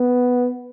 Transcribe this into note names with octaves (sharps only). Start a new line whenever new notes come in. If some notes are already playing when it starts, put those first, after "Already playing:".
Already playing: B3